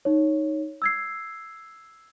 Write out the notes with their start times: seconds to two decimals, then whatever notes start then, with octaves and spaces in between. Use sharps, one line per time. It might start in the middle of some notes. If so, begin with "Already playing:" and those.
0.05 D#4 C#5
0.82 E6 G#6 C7